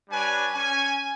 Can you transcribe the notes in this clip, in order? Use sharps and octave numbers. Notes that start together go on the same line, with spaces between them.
G3 D4 B4 C#5 G#5
C#4 G#5